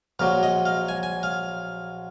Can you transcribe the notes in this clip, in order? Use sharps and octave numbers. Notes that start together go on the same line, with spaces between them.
A#1 A#2 F#3 F5
D#5
F5
G#5
G#5
F5